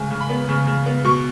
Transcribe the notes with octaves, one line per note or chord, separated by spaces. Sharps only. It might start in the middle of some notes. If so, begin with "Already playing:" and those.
Already playing: G#2 C#3 G#5
C#3
B5
B3
C#3
C#3
B3
B2 C#6